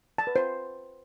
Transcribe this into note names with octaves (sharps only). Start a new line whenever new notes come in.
A5
B4
C5